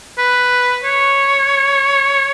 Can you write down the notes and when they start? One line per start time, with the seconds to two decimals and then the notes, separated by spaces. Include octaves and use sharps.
0.18 B4
0.84 C#5